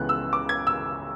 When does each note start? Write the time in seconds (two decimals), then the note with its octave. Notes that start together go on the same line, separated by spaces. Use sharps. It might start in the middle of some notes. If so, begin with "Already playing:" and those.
Already playing: C#2 C#3 E3 B3 F#6
0.09 E6
0.33 D6
0.49 G#6
0.67 E6